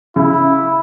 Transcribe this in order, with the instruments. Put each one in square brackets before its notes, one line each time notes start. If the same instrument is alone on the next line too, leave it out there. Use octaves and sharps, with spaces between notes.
[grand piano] C#3 [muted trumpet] E4